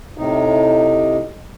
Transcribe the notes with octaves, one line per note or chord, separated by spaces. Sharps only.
A2 C3 D#4